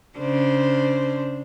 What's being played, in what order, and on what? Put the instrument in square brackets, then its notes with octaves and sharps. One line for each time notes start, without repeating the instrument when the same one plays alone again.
[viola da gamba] C#3 D4 C5